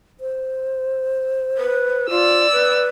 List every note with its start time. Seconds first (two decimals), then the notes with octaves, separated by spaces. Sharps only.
0.20 C5
1.57 B4
2.10 F4 D5 E6
2.52 B4